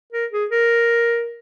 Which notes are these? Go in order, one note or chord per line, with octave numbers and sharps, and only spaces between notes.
A#4
G#4
A#4